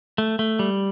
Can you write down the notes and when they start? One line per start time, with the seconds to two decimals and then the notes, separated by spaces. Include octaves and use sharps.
0.18 A3
0.39 A3
0.59 G3